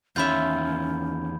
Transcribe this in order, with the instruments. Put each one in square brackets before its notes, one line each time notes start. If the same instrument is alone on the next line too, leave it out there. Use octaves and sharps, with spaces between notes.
[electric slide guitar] E2 D#3 C#5 [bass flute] C#4 [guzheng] F4 E5 [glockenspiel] B5 G6